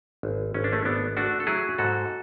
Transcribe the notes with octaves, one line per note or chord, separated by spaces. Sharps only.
G#1
G#1 C#4
D4
A3 C#4
G#1 B3 D4
A3 D4 F#4
A4
F#3 E4 G#4
G#2 F#4 A4